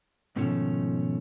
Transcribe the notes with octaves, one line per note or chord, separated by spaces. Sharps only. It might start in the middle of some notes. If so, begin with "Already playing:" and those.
G#2 B2 D#3 F3 A3 C#4